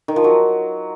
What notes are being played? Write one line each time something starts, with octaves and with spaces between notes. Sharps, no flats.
D#3
F3
F#3